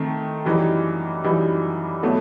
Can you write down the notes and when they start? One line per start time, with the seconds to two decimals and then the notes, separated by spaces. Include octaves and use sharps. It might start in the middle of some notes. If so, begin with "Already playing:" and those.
Already playing: D#3 A3 C4
0.45 F#2 E3 G3 D#4
1.24 F#2 E3 G3 D#4
2.03 B2 F#3 A3